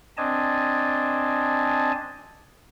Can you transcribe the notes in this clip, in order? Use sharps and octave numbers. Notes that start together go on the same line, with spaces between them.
C4 D4 D#5 G#5 A5